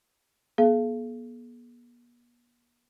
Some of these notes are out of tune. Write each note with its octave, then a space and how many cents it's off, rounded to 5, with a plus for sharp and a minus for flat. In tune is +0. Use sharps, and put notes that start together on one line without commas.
B3 -45 G#4 +45 F5 -35